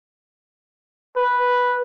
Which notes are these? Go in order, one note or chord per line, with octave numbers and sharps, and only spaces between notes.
B4